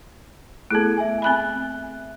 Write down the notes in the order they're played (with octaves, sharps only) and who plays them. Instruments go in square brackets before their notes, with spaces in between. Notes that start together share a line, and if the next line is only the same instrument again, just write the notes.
[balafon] A3 B3 [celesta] E4 G#4 A4
[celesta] E5 G#5
[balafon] C4 G#5 B5 [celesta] E5 F#6